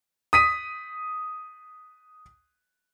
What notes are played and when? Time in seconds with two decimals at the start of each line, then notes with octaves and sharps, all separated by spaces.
0.33 D#6 B6 D#7